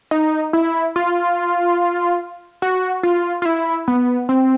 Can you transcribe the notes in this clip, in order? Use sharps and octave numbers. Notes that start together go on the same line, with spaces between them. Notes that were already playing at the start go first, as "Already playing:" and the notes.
D#4
E4
F4
F#4
F4
F4
E4
B3
C4